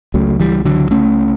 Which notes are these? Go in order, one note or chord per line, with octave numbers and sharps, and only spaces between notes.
C#2 C#3 F#3 A3
E3 G3
D3 F#3
A3 C#4